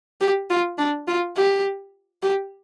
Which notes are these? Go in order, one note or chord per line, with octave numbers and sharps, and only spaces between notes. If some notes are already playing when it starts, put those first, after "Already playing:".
G4
F4
D4
F4
G4
G4